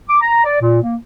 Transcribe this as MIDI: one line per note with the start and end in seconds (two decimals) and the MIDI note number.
0.09 0.20 86
0.21 0.44 82
0.44 0.57 74
0.60 0.78 46
0.82 0.96 58